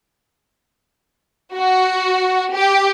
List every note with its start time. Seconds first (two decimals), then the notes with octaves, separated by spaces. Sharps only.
1.55 F#4
2.54 G4